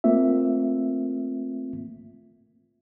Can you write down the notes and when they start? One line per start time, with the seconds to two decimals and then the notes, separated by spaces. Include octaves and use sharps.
0.04 A3 A#3 C4 F4 E5